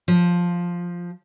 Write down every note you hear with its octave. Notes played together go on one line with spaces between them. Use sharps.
F3